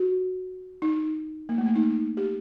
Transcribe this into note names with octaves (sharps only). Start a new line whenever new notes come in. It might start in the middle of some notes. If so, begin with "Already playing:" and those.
Already playing: F#4
D#4
A#3
A3
A#3
D#4
G4